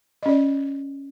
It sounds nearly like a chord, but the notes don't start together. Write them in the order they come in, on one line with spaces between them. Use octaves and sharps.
D#5 C#4 D5